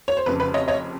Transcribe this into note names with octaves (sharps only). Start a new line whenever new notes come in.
C#5
C5
F1 F2 C#3 B4
B4
C#5 D#5
C#5 D#5